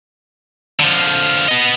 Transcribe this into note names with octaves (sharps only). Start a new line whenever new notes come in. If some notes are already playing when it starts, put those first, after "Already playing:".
D3 F3
B3 D#5